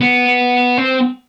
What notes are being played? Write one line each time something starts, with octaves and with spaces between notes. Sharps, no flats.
B3
C4